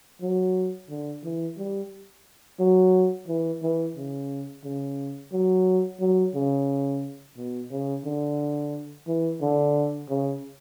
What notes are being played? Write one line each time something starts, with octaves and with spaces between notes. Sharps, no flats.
F#3
D3
E3
G3
F#3
E3
E3
C#3
C#3
F#3
F#3
C#3
B2
C#3
D3
E3
D3
C#3